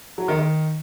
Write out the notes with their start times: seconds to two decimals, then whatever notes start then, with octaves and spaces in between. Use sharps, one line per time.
0.18 F#3
0.28 D#3
0.39 D#3